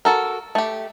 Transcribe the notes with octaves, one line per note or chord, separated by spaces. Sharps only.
F#4 A4 A#4
A3 G4